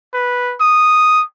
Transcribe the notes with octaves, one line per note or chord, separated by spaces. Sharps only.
B4
D#6